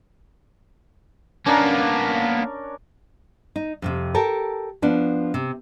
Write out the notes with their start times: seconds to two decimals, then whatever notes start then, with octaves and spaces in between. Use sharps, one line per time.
1.46 A#3 B3 C#4 D4 A#4
3.56 D#4
3.82 F2 A2 C3
4.14 G4 A4 A#4
4.82 F3 B3 D4
5.34 C3